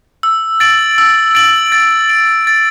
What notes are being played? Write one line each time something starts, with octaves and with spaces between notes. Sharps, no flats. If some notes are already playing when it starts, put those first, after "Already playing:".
E6
A6 D7 F#7
E6
A6 D7 F#7
A6
D7 F#7
A6